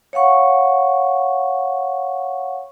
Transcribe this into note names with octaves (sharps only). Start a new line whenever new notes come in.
C#5 F5 F#5 C#6